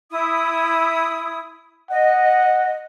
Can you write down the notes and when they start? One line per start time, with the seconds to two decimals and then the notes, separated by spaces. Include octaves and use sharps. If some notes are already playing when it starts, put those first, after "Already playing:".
0.11 E4 D#6
1.90 D#5 F#5